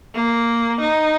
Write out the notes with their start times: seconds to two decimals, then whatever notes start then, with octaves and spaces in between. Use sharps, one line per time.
0.15 A#3
0.81 D#4